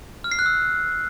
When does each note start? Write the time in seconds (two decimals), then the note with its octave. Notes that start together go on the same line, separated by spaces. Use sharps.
0.24 F6
0.32 C7
0.39 F#6
0.46 E6